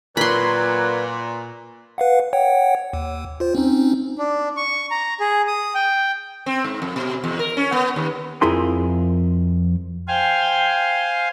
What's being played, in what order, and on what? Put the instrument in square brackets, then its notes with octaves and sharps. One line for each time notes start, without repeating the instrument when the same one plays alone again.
[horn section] A#2 [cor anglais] F#3 [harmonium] B4 D5 [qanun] B5 C6
[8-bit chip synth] B4 F5 F#5
C#5 F#5 G5
D#2
F4 C5
C4 C#4 D#4
[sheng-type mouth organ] D4
C#6
A#5
G#4
D#6
G5
[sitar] C4
G#2
F2
B2
E2
A#4
C#4
B3
D#2
[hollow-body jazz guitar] F2 F3 E4 G#4 A#4 C6
[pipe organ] C5 F5 G#5 [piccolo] G5